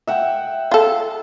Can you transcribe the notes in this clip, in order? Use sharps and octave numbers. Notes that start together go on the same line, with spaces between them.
E5 F#5 G5
F4 A4